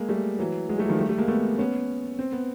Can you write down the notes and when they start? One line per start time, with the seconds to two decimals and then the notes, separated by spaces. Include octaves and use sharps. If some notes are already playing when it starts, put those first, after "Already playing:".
Already playing: G#3 A#3
0.09 G3 A3
0.39 E3 F#3
0.69 F#3 G#3
0.79 G3 A3
0.84 F#3
0.89 D#3 F3
0.99 G3 A3
1.09 G3 A3
1.18 G#3 A#3
1.28 A3 B3
1.58 B3 C#4
2.19 C4
2.32 B3